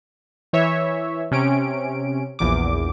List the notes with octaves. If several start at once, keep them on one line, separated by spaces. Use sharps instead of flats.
E3 C#5 E5
C3 C#4 D7
A#1 E2 D6